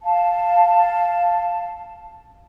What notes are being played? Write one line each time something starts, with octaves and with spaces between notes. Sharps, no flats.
F5 A5